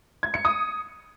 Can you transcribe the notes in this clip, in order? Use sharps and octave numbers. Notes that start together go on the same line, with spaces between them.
G#6
C#7
D#6